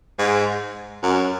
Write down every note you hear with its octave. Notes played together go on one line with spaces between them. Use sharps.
G#2
F#2